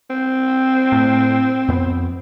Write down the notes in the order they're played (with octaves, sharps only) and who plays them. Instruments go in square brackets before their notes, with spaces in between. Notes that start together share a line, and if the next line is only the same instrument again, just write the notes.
[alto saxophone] C4
[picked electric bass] A2
F2 B3